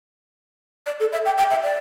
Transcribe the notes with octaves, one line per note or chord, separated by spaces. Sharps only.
D5
A4
E5
G5
G5
E5
D5